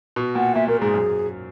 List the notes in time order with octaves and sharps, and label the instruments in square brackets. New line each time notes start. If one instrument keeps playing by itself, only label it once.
[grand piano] B2
[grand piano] A#2 [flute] F#5
[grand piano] A#2 [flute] E5
[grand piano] A#2 [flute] A#4
[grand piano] G#2 [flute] G#4
[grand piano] F#2